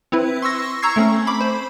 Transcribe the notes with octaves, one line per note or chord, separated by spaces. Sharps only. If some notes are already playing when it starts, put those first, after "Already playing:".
C4 E4 B4
C6 C#6 E6 A#6
A#5 C#6 E6 G#6 C7
A3 C4 C#4
B5 D6
C5